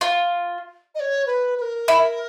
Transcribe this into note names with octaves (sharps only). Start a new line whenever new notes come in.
F4
D#5
C#5
B4
B4
A#4
E4